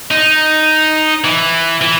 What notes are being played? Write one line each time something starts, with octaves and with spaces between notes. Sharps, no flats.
D#4
E3
E3